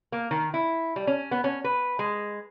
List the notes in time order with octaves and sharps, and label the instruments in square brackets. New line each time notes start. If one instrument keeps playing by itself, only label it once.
[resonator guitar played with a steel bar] A#3
D#3
E4
G3
C#4
B3
C#4
B4
G#3